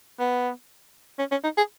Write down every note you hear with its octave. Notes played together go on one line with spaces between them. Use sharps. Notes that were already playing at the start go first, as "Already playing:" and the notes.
B3
C#4
C#4
D#4
G#4